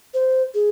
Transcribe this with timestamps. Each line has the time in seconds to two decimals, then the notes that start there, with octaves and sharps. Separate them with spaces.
0.14 C5
0.55 G#4